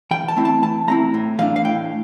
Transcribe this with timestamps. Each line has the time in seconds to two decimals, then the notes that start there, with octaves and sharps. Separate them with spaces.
0.11 E3 G5
0.28 A5
0.37 A3 C4 E4
0.45 A5
0.62 E3 A5
0.88 A3 C4 E4 A#5
1.14 A2
1.39 E3 A3 D4 F5
1.56 F5
1.65 A2 G5